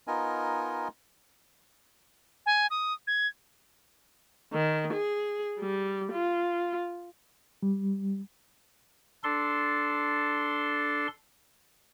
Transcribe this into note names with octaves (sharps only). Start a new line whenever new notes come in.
B3 D#4 F4 A#4 D#5 G#5
G#5
D#6
G#6
D#3
G#4
G3
F4
G3
D4 A4 C6